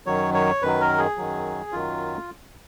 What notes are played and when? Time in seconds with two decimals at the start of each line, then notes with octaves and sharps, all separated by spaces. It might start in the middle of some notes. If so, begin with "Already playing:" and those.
0.06 F#2 D#3 F#3 C#5
0.34 C#5
0.62 F#2 D#3 F#3 B4
0.81 A#4
0.98 G#4
1.17 F#2 D#3 F#3
1.72 F#2 D#3 F#3 F4